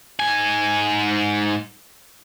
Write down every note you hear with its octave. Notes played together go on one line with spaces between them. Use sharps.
G#2 G#5